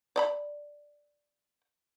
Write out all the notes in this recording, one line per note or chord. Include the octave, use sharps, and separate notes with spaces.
D5 D#5 B5